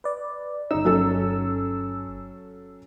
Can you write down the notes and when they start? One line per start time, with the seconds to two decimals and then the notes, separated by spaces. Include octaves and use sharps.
0.04 B4 D5
0.71 G1 D#4 E6
0.85 F#3 C#4 A4